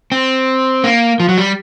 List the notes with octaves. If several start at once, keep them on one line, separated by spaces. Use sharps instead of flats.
C4
A#3
F3
F#3
G3